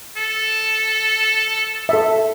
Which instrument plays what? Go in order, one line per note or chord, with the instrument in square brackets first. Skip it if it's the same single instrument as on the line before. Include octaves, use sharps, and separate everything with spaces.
[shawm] A4
[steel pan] A4 E5